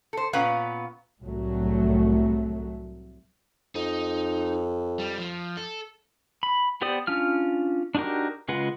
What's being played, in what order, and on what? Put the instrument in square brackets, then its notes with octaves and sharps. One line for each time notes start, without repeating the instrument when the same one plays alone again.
[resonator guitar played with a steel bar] A4 C5
A#2 B3 C#4 B4 F5
[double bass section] C2 A2 F#3 A3
[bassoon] F2 [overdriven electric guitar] D#4
[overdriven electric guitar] G3
F3
A4
[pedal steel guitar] B5
B3 G4 C5 D5 D#6
C#4 D4 F4 F6
D4 D#4 F#4 G4 A#4
C#3 G#3 F4 B4 F#5